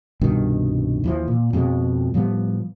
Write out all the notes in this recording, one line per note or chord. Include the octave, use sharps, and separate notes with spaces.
C2 G2 B2 D#3
D#2 E3 F3
A#2
F2 B2 G#3
A2 F3 G3 B3